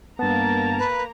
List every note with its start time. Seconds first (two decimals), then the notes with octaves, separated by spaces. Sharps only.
0.19 G2 A#3 B3 A5 A#5
0.79 B4